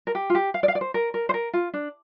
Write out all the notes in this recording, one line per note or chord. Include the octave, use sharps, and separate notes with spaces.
A#4
G4
F4
G4
F5
D5
F5
D5
C5
A#4
A#4
C5
A#4
F4
D4